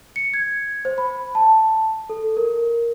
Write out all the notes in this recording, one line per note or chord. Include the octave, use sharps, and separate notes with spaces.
C#7
G#6
C5
B5
A5
A4
A#4